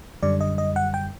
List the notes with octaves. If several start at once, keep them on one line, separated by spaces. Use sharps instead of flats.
F#2 D3 G3 D5
D#5
D#5
F#5
G5